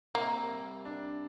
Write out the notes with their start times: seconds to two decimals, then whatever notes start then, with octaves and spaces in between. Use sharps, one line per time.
0.15 C3 A#3
0.51 G3
0.85 D4